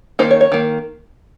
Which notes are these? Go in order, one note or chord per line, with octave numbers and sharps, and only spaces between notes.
D#3 A#3 D#4 C5
C#5
C#5
D#3 A#3